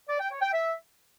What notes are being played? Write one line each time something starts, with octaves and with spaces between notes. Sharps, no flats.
D5
G5
C#5
G5
E5